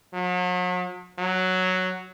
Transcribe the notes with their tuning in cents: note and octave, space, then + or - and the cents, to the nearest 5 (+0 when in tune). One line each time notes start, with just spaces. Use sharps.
F#3 -40
F#3 +0